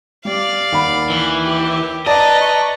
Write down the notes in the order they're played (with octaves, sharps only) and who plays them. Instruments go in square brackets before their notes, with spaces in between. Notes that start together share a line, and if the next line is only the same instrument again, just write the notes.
[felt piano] G3 [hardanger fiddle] D5 F5
[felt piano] D#2 F#5 B5
[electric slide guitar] E3
[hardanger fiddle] G4
[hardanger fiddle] B4 A#5 [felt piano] D5 [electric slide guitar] D#5 [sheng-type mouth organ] A5
[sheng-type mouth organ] A5 C#6